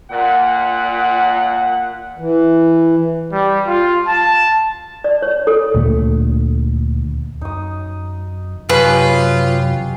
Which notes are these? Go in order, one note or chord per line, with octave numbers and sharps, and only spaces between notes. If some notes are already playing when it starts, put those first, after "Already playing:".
A#2 F#5
E3
G3
F4
A5
D5
C#5
A4
D2 A#2 D3 A3
F#2 D#4 D#6
F#2 C3 F#3 F4 G4 G#4 B4 C#5